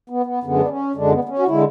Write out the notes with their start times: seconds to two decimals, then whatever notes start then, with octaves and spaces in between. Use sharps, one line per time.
0.10 B3
0.26 B3
0.43 F#2 D3 G#3 B3
0.59 D4
0.69 C#4
0.95 F#2 D3 G#3 D4
1.12 B3
1.24 B3
1.29 C#4
1.39 F#4
1.47 D3 G#3 E4